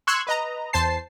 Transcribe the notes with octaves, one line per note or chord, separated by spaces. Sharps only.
C6 C#6 E6 F#6 G#6
B4 D#5 A#5
E2 C5 A5 C7